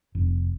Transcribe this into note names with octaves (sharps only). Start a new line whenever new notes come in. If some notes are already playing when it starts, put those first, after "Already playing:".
F1